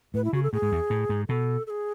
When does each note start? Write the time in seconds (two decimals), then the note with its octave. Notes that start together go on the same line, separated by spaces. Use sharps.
0.14 A2 B4
0.24 E4
0.33 C#3 F#4
0.43 A4
0.53 A2 G#4
0.62 G#2
0.72 E2
0.90 A2
1.09 G#2
1.29 B2 A4
1.67 A4
1.70 G#4